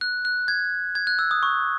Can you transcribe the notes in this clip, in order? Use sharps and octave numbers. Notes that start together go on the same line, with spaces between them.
F#6
F#6
G#6
G#6
F#6
E6
D#6
C#6